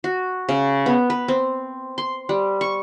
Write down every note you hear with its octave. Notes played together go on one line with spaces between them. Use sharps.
F#4
C#3
B3
B4
C4
C6
G3
C#6